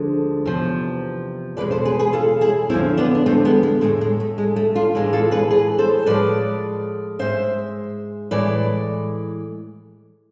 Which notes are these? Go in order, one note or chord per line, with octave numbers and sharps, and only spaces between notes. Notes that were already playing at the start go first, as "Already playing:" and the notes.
Already playing: D2 D3 F3 G#3
E2 C3 F3
E2 B2 G#3 B4 D5
A4 C5
G#4 B4
G#4 B4
F4 A4
E4 G#4
E2 D3 F3 C4 E4
B3 D4
D4
A3 C4
G#3 B3
G#3
A2 G#3 A3
G#3
A3
G#3
A3
D4 F4
A2 E3 G#3
F4 A4
G#4 B4
G#4 B4
A4 C5
A2 F3 G#3 B4 D5
G#2 G#3 C5 E5
A2 E3 G#3 B4 D5